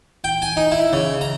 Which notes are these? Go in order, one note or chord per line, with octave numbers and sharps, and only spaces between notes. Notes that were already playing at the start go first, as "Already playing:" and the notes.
G5
G#5
D#4
E4
C#3
A#5